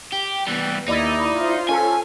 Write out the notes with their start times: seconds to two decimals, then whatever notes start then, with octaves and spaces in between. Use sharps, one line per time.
0.13 G4
0.47 E3 G3 B3
0.88 D#2 D#4 E4 D5 D#6
1.36 F4 C5
1.69 C#4 A4 G#5